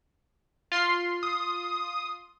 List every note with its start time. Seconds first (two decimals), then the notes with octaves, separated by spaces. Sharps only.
0.72 F4 C6 C7
1.23 D#6